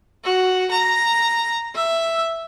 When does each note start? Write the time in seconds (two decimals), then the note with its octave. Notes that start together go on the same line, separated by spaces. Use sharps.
0.24 F#4
0.71 A#5
1.75 E5